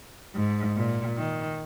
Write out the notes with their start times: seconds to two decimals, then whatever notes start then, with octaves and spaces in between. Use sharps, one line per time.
0.35 G#2
0.77 A#2
1.18 D#3